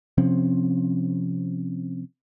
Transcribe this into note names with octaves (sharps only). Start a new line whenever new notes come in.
C3 F3 C4 C#4